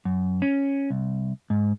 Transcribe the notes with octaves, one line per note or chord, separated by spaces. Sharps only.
F#2
C#4
C2
G#2